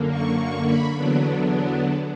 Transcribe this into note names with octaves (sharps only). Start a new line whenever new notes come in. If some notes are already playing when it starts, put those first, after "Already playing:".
Already playing: F#2 D3 A#3
C#6
C#6
B5
E2 D3 F#3 B3 D4